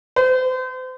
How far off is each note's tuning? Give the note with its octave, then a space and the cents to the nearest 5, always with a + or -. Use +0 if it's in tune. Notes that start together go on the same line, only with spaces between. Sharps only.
C5 -35